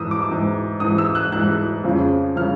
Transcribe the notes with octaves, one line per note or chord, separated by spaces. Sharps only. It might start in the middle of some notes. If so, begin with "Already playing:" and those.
Already playing: G#2 E3 D#6 E6
D6
G#2 E3
G#2 E3 D#6
E6
F#6
G#2 E3 F#6
F2 C#3 F3
C#3 F3 F6